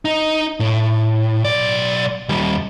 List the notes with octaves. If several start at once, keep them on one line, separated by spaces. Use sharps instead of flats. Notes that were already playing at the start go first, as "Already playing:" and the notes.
D#4
A2
B1 D5
D#2 G3